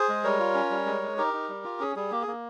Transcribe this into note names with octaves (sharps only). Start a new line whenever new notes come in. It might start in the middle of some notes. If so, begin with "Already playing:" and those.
Already playing: G#4 C5
G#3
G3 A#4 C#5
F4
C#4
G3
G#3
G#3
D#4 G4 A#4
D#4
G3
F4
C#4 G#4
G3 G#4
A#3 G4
G#4
A#3